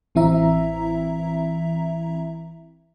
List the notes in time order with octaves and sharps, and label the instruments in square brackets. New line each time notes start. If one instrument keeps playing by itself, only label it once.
[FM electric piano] A1 E3 C4 E4 E5 A#5